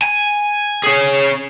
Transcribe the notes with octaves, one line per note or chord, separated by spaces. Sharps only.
G#5
C#4 G#4